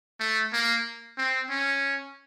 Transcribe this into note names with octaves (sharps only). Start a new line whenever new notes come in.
A3
A#3
C4
C#4